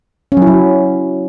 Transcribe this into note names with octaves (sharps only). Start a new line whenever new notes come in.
C#4
F#3
E4
F#3